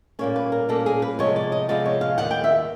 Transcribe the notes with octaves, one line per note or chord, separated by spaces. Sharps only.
A#2 G3 A#3 C#4 C#5
B4
A#4
A#2 G3 A#3 C#4 A4
G#4
B4
C3 F3 G#3 B3 C#5
D5
D#5
C3 F3 G#3 B3 D5
C#5
F5
D#2 D#3 G3 B3 F#5
G5
E5